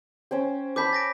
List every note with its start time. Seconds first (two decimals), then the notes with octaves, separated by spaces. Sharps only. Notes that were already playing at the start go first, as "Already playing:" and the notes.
0.31 C#4 C5 G5
0.76 B4 A5 B5 D6 G6 B6
0.93 A6 A#6 D7